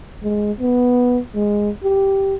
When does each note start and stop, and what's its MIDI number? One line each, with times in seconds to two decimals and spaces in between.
0.23 0.52 56
0.60 1.19 59
1.35 1.70 56
1.83 2.35 67